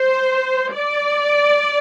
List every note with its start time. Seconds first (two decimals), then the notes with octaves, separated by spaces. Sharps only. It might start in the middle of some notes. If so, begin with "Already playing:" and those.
Already playing: C5
0.73 D5